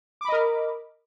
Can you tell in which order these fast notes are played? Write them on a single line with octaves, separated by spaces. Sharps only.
D6 B5 D#5 A#4